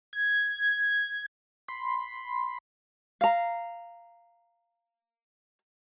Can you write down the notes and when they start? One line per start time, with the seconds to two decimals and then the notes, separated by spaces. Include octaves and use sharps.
0.13 G#6
1.68 B5 C6
3.21 F5 A#5